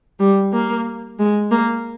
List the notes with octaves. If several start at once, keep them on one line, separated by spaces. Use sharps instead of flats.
G3
A#3
G#3
A#3